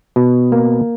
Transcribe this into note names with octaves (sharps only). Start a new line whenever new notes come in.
B2
A#3